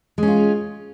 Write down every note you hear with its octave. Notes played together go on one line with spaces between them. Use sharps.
G#3 C#4 F4